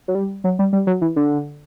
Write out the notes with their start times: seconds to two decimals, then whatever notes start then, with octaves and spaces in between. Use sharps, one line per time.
0.08 F#3
0.15 G3
0.44 F#3
0.59 G3
0.73 G3
0.87 F#3
1.01 E3
1.16 D3